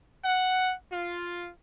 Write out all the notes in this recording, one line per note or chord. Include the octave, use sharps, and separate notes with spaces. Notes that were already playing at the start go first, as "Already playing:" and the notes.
F#5
F4